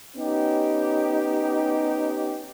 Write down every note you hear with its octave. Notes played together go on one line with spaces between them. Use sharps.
B3 C#4 D#4 G4